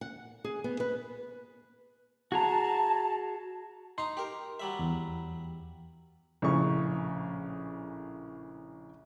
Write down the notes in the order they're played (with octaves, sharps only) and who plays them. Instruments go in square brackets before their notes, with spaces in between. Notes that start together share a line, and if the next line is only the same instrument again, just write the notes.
[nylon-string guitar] F#5
G#4
B3
B4
[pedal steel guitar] F#4 G#4 A#5 [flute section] A5
[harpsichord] D#4 A#5 [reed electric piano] C6
[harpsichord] G4 A#4
F#3 G3 E5
[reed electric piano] E2
[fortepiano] A#1 A2 C#3 C#6